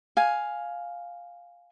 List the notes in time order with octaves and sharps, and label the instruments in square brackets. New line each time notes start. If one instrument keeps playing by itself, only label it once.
[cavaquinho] F5 G#5